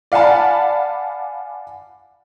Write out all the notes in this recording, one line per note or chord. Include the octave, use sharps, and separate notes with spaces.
D5 F5 F#5 G#5 A5 B5